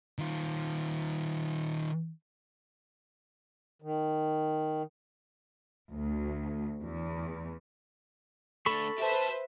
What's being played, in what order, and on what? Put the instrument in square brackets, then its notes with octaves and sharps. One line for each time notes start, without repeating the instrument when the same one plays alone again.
[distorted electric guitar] D#3 F4
[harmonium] D#3
[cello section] D2
E2
[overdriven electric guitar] A3 D4 [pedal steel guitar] A4 B5 C#6
[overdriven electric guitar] G4 A5 [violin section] B4 C5 E5